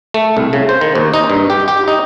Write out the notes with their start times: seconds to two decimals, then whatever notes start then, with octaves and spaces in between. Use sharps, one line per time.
0.14 A3
0.37 C2
0.53 C#3
0.69 C5
0.81 D#3
0.95 D#2
1.14 D#4
1.30 G2
1.50 G4
1.68 G4
1.88 D#4